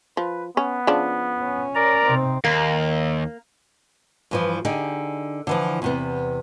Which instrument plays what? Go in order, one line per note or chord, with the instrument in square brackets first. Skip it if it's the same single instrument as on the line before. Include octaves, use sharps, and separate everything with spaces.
[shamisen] F3 [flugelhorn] B4
[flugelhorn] B3 [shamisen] C#4
[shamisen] C#3 F3 D4
[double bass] C#4
[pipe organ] A#4 D5 A#5
[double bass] C3 C4 [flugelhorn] D#4
[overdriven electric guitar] D#2 [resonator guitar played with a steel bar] A#3
[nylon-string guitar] G2 E3 F3
D3 D#4 G4 G#4
D3 E3 F3
E2 C3 B3